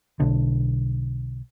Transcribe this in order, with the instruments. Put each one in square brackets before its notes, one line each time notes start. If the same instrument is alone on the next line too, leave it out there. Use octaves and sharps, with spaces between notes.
[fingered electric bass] B1 D3